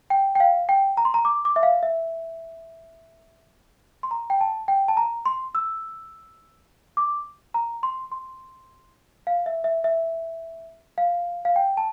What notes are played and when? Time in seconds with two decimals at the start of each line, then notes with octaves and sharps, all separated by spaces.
0.10 G5
0.35 G5
0.40 F5
0.69 G5
0.97 A#5
1.05 C6
1.14 A#5
1.25 D6
1.45 D6
1.56 E5
1.63 F5
1.83 E5
4.03 C6
4.11 A#5
4.30 G5
4.41 A5
4.68 G5
4.88 A5
4.97 A#5
5.25 C6
5.55 E6
6.97 D6
7.54 A#5
7.83 C6
8.11 C6
9.27 F5
9.46 E5
9.64 E5
9.84 E5
10.98 F5
11.45 F5
11.56 G5
11.77 A5